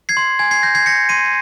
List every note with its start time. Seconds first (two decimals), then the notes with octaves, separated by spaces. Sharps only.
0.09 G#6 C7
0.17 C6
0.39 G#5 G#6
0.51 G#6 C7
0.63 G6 A#6
0.75 G#6 C7
0.86 G6 A#6 C#7
1.09 C6 C7 D#7